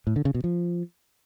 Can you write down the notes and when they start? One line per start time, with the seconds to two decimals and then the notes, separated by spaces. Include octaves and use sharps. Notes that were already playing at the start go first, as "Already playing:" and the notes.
0.07 A2
0.16 D3
0.25 C#3
0.35 B2
0.44 F3